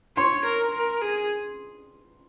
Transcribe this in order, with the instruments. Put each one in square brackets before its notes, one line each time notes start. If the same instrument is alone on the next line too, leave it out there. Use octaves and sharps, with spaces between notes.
[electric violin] C#5 [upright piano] C6
[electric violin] A#4
A#4
G#4